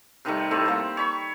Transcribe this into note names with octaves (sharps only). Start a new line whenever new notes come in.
C3 D#3 G3 A3
A2 A3 C4
G3 A#3
C#5 B5 C#6